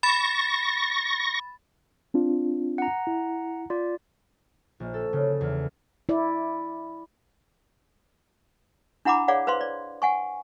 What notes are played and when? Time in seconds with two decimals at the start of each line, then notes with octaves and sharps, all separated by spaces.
0.03 B5 C#6 A6 A#6
2.14 C4 D4 F4
2.78 F#5 A#5
3.07 E4
3.70 F4 D5
4.80 A#1
4.94 A4
5.13 C#3
5.41 E2
6.09 E4 D5
9.05 D4 E4 F#5 A#5 B5 D6
9.28 G#4 C#5 D5 F5 F#5
9.47 B4 C5 F5 C6
9.61 D5
10.02 F#5 G#5 C#6